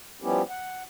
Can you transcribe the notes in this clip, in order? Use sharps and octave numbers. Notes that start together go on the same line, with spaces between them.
F3 G3 B3 C#4 E4 G4
F#5